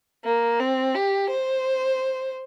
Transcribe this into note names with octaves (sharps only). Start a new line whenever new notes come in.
A#3
C4
G4
C5